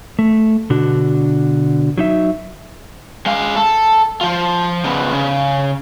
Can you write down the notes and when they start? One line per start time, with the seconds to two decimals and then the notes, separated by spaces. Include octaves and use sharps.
0.19 A3
0.70 B2 D3 D4 F#4
1.98 F#3 D#4 E5
3.26 G#3 F5
3.56 A4
4.21 F3 F4
4.85 C#3 B3
5.12 C#3